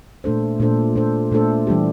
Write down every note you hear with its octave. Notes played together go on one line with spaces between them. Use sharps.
A#2 A3 D4 A4 C5
A#2 A3 D4 A4 C5
A#2 A3 D4 A4 C5
A#2 A3 D4 A4 C5
E3 G3 D4 G4